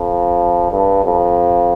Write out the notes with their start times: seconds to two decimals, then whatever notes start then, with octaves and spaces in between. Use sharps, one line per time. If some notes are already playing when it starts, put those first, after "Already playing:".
Already playing: F2
0.72 G2
1.04 F2